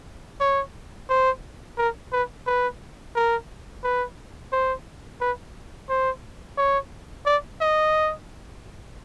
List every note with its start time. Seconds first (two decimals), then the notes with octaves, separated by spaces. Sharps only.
0.40 C#5
1.09 C5
1.78 A#4
2.12 B4
2.46 B4
3.15 A#4
3.84 B4
4.52 C5
5.21 B4
5.89 C5
6.57 C#5
7.26 D5
7.61 D#5